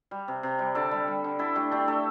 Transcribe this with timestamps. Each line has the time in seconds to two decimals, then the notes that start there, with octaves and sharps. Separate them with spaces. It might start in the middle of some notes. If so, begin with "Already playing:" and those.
0.11 G3
0.28 C3
0.43 C3
0.59 G3
0.75 D3 A4 D5
0.91 G3
1.08 G3
1.24 D3
1.39 D3 E4 A4
1.55 A3 D4 G4
1.72 A3 D4 G4
1.88 A3 E4 A4